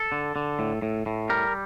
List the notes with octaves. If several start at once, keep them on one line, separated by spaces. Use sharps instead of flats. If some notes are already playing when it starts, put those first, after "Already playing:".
Already playing: A4
D3
D3
A2
A2
A2
G3 A#4